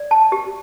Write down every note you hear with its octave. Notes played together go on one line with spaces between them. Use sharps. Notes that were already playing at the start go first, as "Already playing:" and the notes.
Already playing: D5
A5
G4